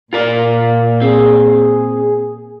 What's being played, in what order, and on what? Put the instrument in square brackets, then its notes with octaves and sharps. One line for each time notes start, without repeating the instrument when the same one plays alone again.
[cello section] A#2 [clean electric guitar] F4 A#4 D5
[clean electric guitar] C4 [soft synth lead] G#4